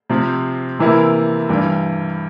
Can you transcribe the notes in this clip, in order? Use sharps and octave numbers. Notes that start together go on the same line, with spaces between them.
C3 F3 C4
C3 E3 A#3 E4
G2 E3 G3